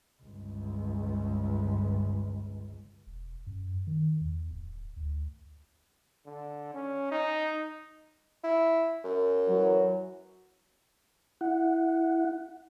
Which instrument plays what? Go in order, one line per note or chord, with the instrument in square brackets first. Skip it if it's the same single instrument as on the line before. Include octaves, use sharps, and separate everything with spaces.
[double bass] G1 C#2
[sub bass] E1
F#2
D#3
E2
D1
D2
[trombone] D3
C#4
D#4
[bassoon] E4
F#2
[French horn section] E3 F#3
[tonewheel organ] E4 F#5